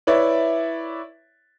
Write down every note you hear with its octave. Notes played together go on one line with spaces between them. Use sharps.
E4 B4 C#5 D5 E5